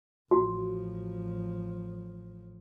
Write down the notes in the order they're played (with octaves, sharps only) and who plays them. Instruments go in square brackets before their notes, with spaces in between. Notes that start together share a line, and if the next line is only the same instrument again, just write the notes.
[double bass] A1 F3 [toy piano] F#4